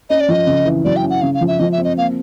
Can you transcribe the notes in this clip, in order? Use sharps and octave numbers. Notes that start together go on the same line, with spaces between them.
C#4 D#5
D5
F3 D#5
C#3
E3
F#3 D5
G5
C#4
F#5
C#3 F5
F5
F3
E5
F3 D#5
E5
C4
D#5
A#3 F5